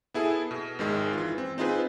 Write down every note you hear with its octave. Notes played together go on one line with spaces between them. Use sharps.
B3 E4 G#4 A4
B2
G#1 D#3 G#3
E3 F4
C4
C4 D#4 F4 G#4 B4